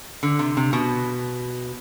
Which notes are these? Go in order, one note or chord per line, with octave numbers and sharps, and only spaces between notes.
D3
C3
C3
B2